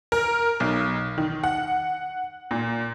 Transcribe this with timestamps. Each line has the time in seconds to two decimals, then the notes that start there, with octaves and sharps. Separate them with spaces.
0.12 A#4
0.60 B1
1.18 D#3
1.44 F#5
2.51 A#2